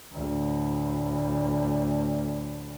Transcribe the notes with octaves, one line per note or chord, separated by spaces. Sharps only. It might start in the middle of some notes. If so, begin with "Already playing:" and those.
D2 A2